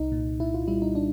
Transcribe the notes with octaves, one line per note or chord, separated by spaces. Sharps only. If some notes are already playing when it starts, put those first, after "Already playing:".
Already playing: C2 D#4
A#2
A#2 E4
F4
G3 E4
D#4
D4